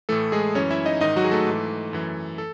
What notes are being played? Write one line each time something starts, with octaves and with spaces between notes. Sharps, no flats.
A2 E3 A3 A4
G#3 G#4
F#2 E3 C#4 C#5
E4 E5
D#4 D#5
G#2 D#3 D#4 D#5
F#3 F#4
G#4
A3 A4
G#2 E3
F#2 E3
A4